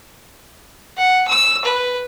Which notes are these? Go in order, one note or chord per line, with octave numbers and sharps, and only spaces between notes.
F#5
E6
B4